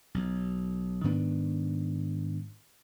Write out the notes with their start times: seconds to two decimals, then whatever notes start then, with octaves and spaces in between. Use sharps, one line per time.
0.14 B1
1.04 G#2 D#3 B3 D4